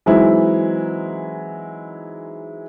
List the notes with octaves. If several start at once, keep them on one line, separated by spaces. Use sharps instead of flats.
E3 F#3 G#3 C4 D#4 E4